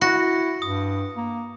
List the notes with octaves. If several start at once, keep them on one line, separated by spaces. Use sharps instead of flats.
E4 F#4 A#6 C#7
G2 D#6
A#3